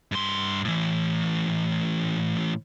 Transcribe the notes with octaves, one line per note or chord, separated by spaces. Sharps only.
G2 C6
A2 E3